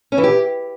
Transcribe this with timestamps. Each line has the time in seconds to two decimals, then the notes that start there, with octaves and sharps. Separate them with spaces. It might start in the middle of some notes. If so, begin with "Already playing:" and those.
0.12 C#4
0.18 E3
0.24 G4